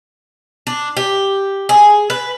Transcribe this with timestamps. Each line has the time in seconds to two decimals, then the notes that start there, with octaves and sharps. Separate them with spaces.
0.67 D4
0.97 G4
1.69 G#4
2.10 B4